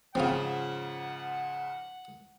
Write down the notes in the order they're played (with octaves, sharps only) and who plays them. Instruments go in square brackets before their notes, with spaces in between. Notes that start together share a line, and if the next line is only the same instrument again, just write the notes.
[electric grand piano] G#2 C#3 F3 [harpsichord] C4 F4 [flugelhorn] F#5